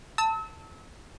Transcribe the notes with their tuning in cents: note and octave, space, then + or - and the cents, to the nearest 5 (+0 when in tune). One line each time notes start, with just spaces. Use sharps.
A5 +20 E6 -35